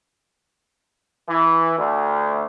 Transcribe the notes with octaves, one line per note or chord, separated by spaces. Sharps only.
E3
D2